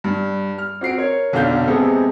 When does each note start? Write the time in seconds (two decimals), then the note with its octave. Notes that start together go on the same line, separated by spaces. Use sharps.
0.04 G2
0.58 F6
0.81 C4 F#4 C7 D7
0.98 A#4 C#5
1.32 F1 B1 D3 F5 G6
1.67 C3 G#3 B3 C4 G#4 A4